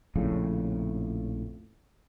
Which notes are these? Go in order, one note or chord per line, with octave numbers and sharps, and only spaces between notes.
A#1 F2 A2 C#3